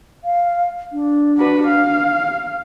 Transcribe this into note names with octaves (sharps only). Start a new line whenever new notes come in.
F5
D4
F#4 B4
F5